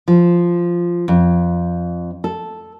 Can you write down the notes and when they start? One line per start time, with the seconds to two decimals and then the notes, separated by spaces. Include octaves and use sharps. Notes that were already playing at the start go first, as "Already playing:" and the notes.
0.08 F3
1.08 F2
2.24 A4